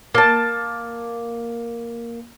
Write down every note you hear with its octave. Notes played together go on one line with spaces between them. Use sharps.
A#3 A5